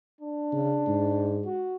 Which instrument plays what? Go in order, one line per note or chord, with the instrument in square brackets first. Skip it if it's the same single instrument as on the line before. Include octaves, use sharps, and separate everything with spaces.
[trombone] D4
[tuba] C#3
G#2
[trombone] F#4